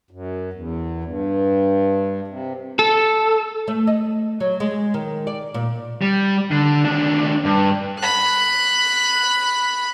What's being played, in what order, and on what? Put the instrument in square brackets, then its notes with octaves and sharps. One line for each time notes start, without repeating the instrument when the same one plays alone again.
[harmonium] F#2
E2
G2
C3
[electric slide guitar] A4
[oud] A3
D#5
F#3
G#3
D#3
D5
A#2
[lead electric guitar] G3
D3
D#2 D4
G2
[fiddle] B5 F#6